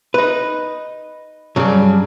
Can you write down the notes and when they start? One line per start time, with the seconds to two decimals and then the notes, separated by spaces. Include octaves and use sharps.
0.14 D#4 B4
1.56 G2 C#3 F#3 D5